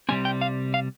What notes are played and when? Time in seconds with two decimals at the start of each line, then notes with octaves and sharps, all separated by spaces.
0.09 C2 C3 D#3 G3 C4 G#5
0.25 G5
0.41 F5
0.74 F5